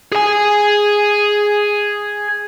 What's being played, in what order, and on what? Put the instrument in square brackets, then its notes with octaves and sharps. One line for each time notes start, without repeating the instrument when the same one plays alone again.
[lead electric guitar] G#4 G#5